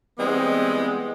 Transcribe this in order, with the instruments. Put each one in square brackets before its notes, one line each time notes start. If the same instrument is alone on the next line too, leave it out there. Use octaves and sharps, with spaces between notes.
[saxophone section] E3 G3 G#3 B3 C4